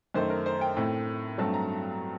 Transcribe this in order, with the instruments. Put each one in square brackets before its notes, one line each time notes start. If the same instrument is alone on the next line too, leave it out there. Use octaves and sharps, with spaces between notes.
[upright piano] F#2 D#3 A3 C5
A#4
C5
G5
A2 A3 C4
G2 F#3 A3 C4 A5
A#5